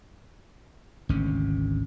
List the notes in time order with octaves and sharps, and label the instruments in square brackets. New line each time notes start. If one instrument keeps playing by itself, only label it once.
[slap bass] G#1 D2 C3 C#4